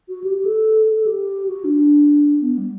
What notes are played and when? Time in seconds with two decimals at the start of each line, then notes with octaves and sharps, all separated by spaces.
0.09 F#4
0.24 G4
0.35 G4
0.45 A4
0.86 A4
0.97 A4
1.06 G4
1.48 F#4
1.64 D4
2.41 B3
2.58 G3